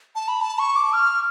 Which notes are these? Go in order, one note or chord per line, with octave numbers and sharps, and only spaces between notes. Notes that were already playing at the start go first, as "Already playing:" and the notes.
A5
B5
A5
C#6
D6
F6